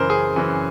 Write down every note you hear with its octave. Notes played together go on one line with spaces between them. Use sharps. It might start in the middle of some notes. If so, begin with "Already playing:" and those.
Already playing: F#2 C#3 E3 A#4 C5
G#4
F#2 C#3 E3